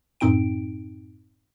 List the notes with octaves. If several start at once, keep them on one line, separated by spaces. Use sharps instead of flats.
F#2 A2 C4 D#4 G5 D7